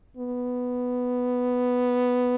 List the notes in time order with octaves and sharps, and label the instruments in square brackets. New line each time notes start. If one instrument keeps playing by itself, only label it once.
[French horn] B3